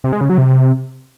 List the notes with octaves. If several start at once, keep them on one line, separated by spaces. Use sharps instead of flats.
C3
G#3
C#3
F#3
C3